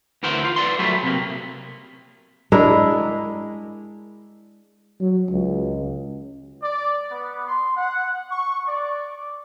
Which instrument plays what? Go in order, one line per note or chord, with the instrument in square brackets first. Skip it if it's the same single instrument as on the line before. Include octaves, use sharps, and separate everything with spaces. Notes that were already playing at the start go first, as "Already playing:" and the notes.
[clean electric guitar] D2 E3 A#4 C5 F#5
F4
B4 D5 F#5 C6
F#3 G3 A3 B3
C3 A#3
[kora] G#3 D4 E4 A#4
[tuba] F#3
C#2
[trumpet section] D5
B3
C6
F#5
C#6
D5